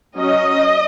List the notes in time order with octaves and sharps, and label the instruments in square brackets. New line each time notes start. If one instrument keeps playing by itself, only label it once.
[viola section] F#3 C#4 D#5